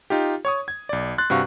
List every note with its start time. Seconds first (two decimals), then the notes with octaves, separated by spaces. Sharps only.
0.10 D#4 F4 G4
0.45 C#5 C#6 D#6
0.68 G#6
0.89 B1 D5
1.18 C6 F#6 A6
1.30 G2 C3 F#4 F5 C#6